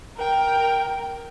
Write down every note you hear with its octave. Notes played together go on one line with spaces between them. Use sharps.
A#4 G5